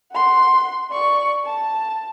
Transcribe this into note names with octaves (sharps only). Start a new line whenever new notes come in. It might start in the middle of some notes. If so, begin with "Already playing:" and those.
F#5 C6
D5 C#6
A5